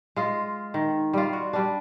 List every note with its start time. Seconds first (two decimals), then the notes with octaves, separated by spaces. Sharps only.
0.16 G#3 F4
0.74 D#3
1.13 G3 F4
1.33 F#4
1.53 G3 D4